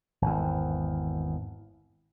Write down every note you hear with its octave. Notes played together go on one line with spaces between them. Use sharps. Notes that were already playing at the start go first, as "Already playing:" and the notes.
G#1 E2